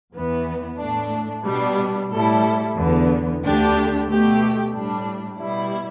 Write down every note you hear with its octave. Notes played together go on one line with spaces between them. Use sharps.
E2 E3 B3
A2 A3 D4
B2 G3 D4
A2 G3 E4 A4
E2 D3 B3
D2 D3 A3 D4 G4
B2 A3 G4
A2 G3 D4
B2 G3 E4